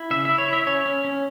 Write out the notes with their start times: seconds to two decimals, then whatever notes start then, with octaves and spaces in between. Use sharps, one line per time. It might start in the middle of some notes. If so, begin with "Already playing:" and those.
Already playing: E4
0.11 C#3 E5
0.25 E4 E5
0.38 C#5
0.48 E4 E5
0.67 C#4 C#5
0.86 C#4
1.04 C#4